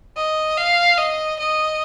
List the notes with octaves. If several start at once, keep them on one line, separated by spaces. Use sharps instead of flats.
D#5
F5
D#5
D#5